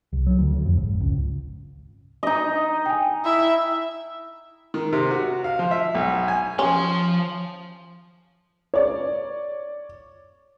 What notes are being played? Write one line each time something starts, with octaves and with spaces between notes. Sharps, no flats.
C2
F#3
D2
D2
F2
G#1
C#2
D#4 D#5
G5 G#5
E4 E5
D#3
C3
F#4
F5
F3
E5
B1
G#5
F3 C#4 C6
C#5 D5